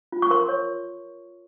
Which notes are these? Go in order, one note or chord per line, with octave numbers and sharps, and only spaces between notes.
F4
C#6
A#4 C6
C#5